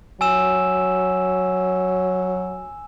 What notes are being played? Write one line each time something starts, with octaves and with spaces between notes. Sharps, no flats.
F#3 G#5 E6 E7